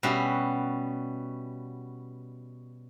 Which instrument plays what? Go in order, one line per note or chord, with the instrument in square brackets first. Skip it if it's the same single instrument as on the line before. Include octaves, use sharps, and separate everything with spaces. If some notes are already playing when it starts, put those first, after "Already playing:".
[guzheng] B2 G3 C#4 F#4 E5